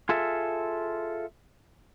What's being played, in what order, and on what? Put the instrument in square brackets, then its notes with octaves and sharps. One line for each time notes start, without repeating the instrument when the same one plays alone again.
[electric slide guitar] F4 G#4 A4 E5